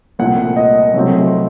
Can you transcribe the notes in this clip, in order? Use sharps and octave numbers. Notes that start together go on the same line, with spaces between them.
C2 A#2 A3 C4 F#5
D#5
C2 C3 F#3 A3 C4